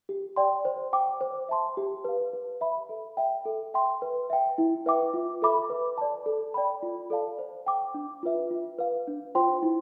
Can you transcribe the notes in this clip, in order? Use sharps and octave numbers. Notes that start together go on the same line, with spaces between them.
G4
D5 G5 C6
C5
G5 D6
C5
E5 A5 C6
G4
B4 F5
B4
E5 B5
A4
E5 G5
A4
E5 G5 C6
B4
E5 G5
E4
B4 E5 G5 D6
F4
A4 E5 B5 D6
B4
D5 A5
A4
D5 G5 B5
F4
A4 D5 F5 A5
C5
G5 D6
D4
F4 B4 E5
F4
B4 F5
D4
F4 C5 G5 C6
E4